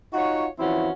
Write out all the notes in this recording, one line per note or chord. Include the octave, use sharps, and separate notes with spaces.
D#4 F4 F#4 C#5 F#5
E3 F3 C4 C#4 E4 F#4